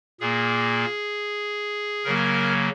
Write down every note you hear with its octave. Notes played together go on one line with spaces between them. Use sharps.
A#2 A#3 G#4
C#3 F#3 A#3 A#4